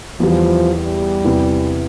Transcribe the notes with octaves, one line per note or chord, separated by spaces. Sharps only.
E2 E3 F3 G3
G3
E2 C3 E3